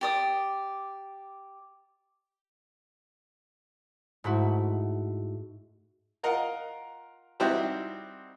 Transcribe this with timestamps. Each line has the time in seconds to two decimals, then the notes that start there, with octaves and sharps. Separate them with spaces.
0.01 G4 D5 D#6
4.24 G#2 A3 E4 F#4
6.23 F4 A#4 D#5 F5 F#5
7.40 G3 C4 D#4 E4 F#4 G4